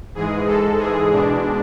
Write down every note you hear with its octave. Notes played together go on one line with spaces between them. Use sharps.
G#2 E3 G#3 G#4
G#2 G#3 A4
G#2 E3 G#3 G#4
B2 G#3 D4